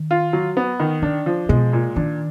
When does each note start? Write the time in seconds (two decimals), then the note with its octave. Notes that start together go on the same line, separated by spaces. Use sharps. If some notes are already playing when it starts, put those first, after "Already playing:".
Already playing: D#3
0.11 F4
0.33 F#3
0.57 B3
0.80 D#3
1.02 D3 D4
1.26 F3
1.49 B2 G#3
1.73 A#2
1.96 D#3 D4